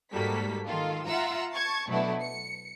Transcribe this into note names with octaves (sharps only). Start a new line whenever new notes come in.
G#2 G3 A#3 F#4 A4 B6
D#3 F4 A4
F4 E5 F#5 A#5 E6
A5 C#6 G#6
B2 F#3 A3 B3 D4 E4
C#7